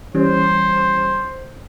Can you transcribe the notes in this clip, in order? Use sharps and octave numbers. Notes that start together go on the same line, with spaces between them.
E3 G3 C#4 C5